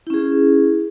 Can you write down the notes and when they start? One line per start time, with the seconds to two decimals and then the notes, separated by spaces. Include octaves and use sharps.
0.07 E4
0.10 C#4
0.14 G#4